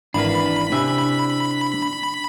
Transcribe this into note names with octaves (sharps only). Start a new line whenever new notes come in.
G#1 E3 D4 A#4 B4 B5
C3 D4 E4 E5 G#5